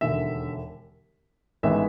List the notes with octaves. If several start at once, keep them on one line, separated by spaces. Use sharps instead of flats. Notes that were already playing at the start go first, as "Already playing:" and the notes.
E1 D#2 D3 E5
A1 G#2 D#3 G#3 B3 E5